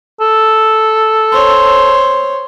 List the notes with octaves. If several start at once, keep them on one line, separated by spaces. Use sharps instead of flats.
A4
C5 C#5